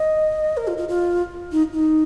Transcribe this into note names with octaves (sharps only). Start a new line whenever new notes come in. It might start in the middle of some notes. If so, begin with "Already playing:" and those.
Already playing: D#5
A#4
F4
F4
F4
D#4
D#4